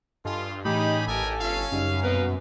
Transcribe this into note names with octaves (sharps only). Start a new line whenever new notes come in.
G2 F4 A4 D#5 G#5
A2 E3 C#4 D#4 G4 G#4 B5
A1 G4 A4 A#4 G#5
G1 C#4 F4 F5
F#2 C#3 G3 D#4
G2 B2 C4 D#4 A#4 B4 F5